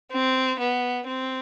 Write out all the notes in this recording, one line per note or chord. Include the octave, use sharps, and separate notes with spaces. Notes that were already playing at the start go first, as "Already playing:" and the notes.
C4
B3
C4